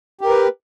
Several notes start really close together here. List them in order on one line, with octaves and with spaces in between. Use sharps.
G4 A#4 B4